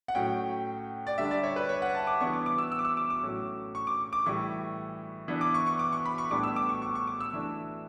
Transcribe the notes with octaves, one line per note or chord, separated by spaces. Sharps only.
F#5
A2 F#3 C#4 G5
D5
D3 G3 D4 E5
D5
C#5
B4
C#5
F#5
A5
D6
E3 G3 B3 D4 C#6
D6
D6
E6
E6
D6
E6
D6
D6
A2 F#3 C#4
C#6
D6
D6
A2 E3 G3 C#6
E3 B3 D4
D6
C#6
C#6
D6
C#6
B5
C#6
A2 G3 B3 D4 D6
E6
D6
C#6
C#6
C#6
D6
E6
E3 A3 D4